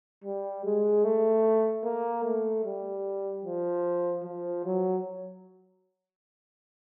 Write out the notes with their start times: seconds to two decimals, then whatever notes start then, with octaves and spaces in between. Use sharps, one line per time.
0.24 G3
0.64 G#3
1.04 A3
1.84 A#3
2.24 A3
2.64 G3
3.44 F3
4.23 F3
4.64 F#3